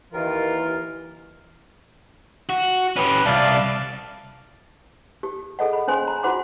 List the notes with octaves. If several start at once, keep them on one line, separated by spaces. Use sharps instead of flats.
D#2 E3 F4 A#4
F#4
C#4 G4 B4
C2 D5 F5 A5
G4
G#4 A4 D#5 F#5
B5
C#4 C5 G#5 C6
A#5
F4 F#4 C5 F#5 C6 D6